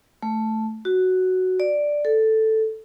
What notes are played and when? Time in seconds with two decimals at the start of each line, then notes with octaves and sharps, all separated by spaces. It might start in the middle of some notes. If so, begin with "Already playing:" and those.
0.23 A3
0.85 F#4
1.60 D5
2.05 A4